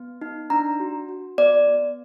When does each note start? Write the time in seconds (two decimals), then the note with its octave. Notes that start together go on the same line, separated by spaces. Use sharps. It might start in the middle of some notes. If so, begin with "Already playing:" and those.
Already playing: B3
0.21 D#4
0.50 D4 A#5
0.80 F#4
1.09 F#4
1.38 B3 D5
1.67 B3